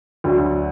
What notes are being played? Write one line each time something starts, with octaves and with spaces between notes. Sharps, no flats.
D2 D3 F#3